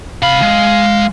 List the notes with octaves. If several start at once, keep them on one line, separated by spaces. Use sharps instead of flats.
C3 F5 B5
G#3